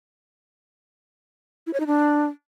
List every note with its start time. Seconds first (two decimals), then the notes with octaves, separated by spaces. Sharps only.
1.67 E4
1.73 C#5
1.80 D#4
1.87 D4